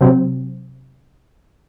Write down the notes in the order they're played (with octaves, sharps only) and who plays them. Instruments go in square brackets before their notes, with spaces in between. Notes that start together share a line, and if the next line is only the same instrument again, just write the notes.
[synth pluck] C3 F#3 C4